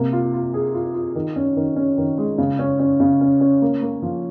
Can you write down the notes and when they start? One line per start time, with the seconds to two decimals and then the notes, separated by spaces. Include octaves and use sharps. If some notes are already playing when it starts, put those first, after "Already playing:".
Already playing: C3 A#3
0.13 F4
0.34 F4
0.54 G#4
0.74 F4
0.94 F4
1.15 D#3
1.36 C#4
1.56 D#3
1.76 C#4
1.98 D#3
2.18 G#3
2.38 C#3
2.59 C#4
2.80 C#4
3.00 C#3
3.21 C#4
3.41 C#4
3.62 A#3
3.82 A#3
4.02 F3